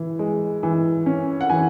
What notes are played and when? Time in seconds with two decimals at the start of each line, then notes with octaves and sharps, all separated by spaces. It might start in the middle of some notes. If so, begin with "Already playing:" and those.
Already playing: E3
0.19 G#3
0.63 E3
1.06 C#4
1.41 F#5
1.50 E3 G#5